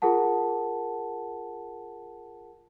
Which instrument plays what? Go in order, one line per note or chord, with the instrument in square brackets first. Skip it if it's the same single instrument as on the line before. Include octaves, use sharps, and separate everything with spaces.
[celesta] F4 G#4 A#4 F#5 A5